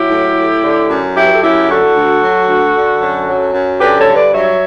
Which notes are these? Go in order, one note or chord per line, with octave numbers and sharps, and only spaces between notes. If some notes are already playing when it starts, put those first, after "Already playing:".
Already playing: F#3 E4 G4
A2
A2
D3
F#2
F#3 E4 G4
B4
A4
F#2 E4 G4
D3 F#4 A4
D2
F#3
D2
D3
F#2
F#3
F#2
D3 G4 B4
A4 C#5
G2
B4 D5
F#3 C#5 E5